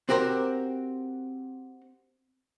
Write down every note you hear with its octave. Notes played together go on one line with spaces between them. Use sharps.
C4 F#4 G4 A#4 C5